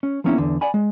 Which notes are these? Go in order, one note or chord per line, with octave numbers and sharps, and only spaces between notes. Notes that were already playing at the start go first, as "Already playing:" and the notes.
C#4
F3 A#3 B3 C#4 D4 E4
E2 D3
D5 F#5 G#5 B5
G#3